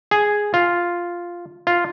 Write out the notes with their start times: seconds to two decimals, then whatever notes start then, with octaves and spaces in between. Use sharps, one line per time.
0.11 G#4
0.54 F4
1.67 F4